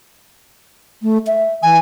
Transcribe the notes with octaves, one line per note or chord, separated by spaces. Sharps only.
A3
E5
E3 G#5